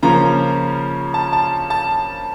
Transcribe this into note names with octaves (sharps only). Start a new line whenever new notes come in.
C#3 F3 A#3 C#4 A#5
A5
A5
A5